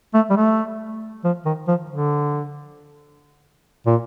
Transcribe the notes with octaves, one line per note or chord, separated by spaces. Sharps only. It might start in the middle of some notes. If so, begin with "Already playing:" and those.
A3
G3
A3
F3
D#3
F3
D3
A#2